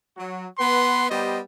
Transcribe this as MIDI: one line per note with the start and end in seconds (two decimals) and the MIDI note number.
0.17 0.47 54
0.58 1.08 59
0.58 1.08 71
0.58 1.08 78
0.58 1.08 84
1.09 1.38 55
1.09 1.38 59
1.09 1.38 67
1.09 1.38 72
1.09 1.38 75